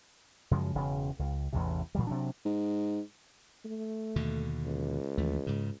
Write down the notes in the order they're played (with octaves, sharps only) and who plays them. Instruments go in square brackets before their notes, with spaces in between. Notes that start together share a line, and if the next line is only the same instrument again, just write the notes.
[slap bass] F#2 C#3 F3 G#3
E1 C#3
C#2
A1 E2 A2 C3
A#2 E3 F#3 G3
C3 F#3 D4
[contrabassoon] G#2
[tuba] A3
[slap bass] D#2 B2 D3
[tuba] C#2
[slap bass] D#2 E3 A3
G#2 C#3